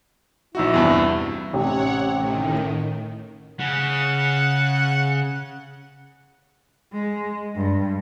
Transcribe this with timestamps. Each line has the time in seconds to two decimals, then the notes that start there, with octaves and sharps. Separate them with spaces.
0.55 A#1 D#4 E4 F#4
0.74 E2 G2 C3
1.53 A1 C3 C#5 F#5
2.16 A2 D#3
3.60 C#3 F#5
6.92 G#3
7.56 G2